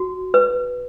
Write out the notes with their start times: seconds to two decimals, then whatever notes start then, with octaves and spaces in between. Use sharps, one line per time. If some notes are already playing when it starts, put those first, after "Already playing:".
Already playing: F#4
0.34 B4